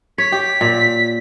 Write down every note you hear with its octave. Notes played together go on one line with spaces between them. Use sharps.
C#5 B6
G4
A#2